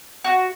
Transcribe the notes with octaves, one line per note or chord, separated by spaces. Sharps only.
F#4